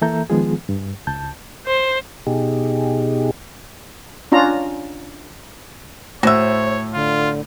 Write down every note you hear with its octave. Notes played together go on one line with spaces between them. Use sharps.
E3 A#3 A4 E5 A#5 G6
D#3 F3 G#3 B3 F4 G#4
G2
C#2 A5 G6
C5
B2 D#4 G4 G#4
C#4 D4 F4 A#5
A2 F#4 C5 C#5 E5
D3 F4